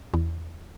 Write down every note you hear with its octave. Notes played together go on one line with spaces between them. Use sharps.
E2